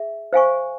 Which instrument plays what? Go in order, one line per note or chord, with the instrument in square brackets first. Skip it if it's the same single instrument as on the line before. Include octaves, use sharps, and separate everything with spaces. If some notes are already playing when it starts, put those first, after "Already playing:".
Already playing: [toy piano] G#4 E5
C5 F5 G#5 C#6